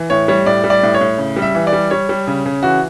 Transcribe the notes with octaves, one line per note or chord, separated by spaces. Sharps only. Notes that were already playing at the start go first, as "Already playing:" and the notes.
Already playing: E3
A2 C#5
G3 C#5
A2 D5
G3
D5
A2
C#5
A2
C#3
G3
E5
E3
D5
G3
G3 C#5
G3
C#3
C#3
E3 F#4